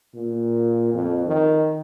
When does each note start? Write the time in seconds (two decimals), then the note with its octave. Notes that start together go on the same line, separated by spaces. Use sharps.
0.15 A#2
0.94 F2
1.27 D#3